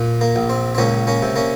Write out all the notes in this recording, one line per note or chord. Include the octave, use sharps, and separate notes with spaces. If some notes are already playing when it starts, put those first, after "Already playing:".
Already playing: A#2
A#3
A#1
C4
C4
C#2 A#3 C#4
A#3 C#4
C3
A#3 C#4